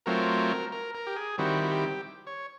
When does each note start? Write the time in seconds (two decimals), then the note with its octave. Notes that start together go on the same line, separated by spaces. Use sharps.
0.06 F#3 A3 C4 F4 A#4
0.72 A#4
0.95 A#4
1.07 G4
1.16 G#4
1.38 D#3 G3 C4 E4 F#4
1.64 F#4
1.71 G4
2.27 C#5